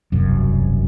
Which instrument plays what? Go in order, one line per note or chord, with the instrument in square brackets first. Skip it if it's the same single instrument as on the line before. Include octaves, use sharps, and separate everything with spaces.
[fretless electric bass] E1 C2 F#2